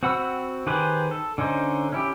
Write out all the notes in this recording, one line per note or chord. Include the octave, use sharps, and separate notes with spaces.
C4 F#4 F#5 B5 E6
D#3 G4 G#4 B4 C5
A4
D3 C#4 D#4 C5
C#4 E4 G4